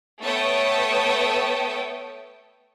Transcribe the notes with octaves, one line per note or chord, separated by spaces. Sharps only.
A3 B3 A4 C#5 G5 D#6